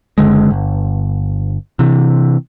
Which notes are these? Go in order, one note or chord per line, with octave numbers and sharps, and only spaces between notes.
F#1 D2 D3 G#3
G1
C3 E3